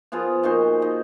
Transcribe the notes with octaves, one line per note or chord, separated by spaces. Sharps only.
F3 B3 F4 G#4
A#2 D#4 F#4 C5
D#4